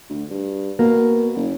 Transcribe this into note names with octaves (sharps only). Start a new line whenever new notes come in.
D2
G2
B2 A#3
F#1